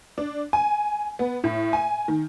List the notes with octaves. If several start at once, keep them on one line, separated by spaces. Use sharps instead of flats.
D4
G#5
B3
A2
G#5
D#3